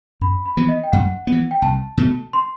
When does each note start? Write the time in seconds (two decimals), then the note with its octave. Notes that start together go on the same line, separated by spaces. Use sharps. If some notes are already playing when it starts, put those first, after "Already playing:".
0.21 F#2 B5
0.46 B5
0.57 E3 B3
0.69 D#5
0.83 G5
0.92 F#2 F#5
1.27 B3
1.32 E3
1.51 G5
1.62 C2 A5
1.97 B2 A3
2.33 C6